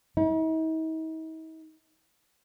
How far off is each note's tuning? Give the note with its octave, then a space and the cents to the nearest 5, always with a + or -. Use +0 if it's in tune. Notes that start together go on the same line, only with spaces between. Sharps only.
D#4 +45